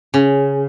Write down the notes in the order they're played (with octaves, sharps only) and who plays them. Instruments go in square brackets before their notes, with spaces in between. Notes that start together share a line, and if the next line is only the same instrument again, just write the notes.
[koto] C#3